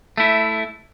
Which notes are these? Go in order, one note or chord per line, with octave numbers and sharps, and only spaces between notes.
A3 E4